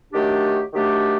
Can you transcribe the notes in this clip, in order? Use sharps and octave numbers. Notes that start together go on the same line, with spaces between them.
D#3 F#3 A3 D4 G4
D#3 F#3 A3 D4 G4